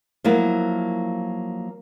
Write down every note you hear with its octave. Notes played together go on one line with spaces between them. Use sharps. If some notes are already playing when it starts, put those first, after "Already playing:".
F3 F#3 A#3 E4